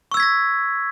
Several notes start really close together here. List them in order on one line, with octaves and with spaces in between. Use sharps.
C#6 E6 G#6 B6 A#6